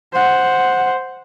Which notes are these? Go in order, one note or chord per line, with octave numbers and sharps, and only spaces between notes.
C5 F#5